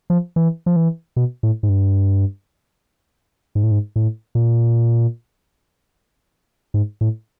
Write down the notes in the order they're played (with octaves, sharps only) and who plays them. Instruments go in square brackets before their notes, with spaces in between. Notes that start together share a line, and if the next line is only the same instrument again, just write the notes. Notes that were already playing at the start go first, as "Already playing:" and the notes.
[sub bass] F3
E3
F3
E3
B2
A2
G#2
G2
G#2
A2
G#2
A2
A#2
G#2
A2